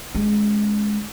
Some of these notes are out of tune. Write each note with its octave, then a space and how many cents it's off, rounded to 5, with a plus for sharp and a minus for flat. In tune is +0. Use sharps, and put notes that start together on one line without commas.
G#3 +10 C#4 +0